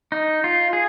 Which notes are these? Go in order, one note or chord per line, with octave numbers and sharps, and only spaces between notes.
D#4
F4
G#4